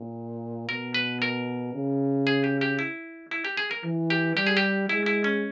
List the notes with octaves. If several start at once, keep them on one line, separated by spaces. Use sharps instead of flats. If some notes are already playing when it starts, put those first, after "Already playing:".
Already playing: A#2
B2 A#4
B4
A#4
C#3
G#4
G4
G4
E4
E4
G4
G#4
A#4
E3
G4
G3 G4
G#4
G4
G#3 E4
E4
C#4